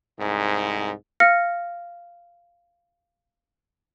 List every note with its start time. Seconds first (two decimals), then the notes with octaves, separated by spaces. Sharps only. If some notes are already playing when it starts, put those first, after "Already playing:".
0.19 C2 G#2
1.20 F5 F6 A#6 C#7